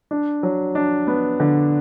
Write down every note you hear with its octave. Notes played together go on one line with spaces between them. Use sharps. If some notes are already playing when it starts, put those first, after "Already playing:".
D4
F#3
D4
B3
D3